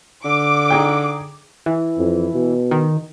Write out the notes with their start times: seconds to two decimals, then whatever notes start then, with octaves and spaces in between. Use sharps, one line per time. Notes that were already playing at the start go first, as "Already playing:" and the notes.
0.25 D3 D6
0.70 D#4 G#4 G5
1.66 E3
1.98 F2
2.34 B2
2.71 D#3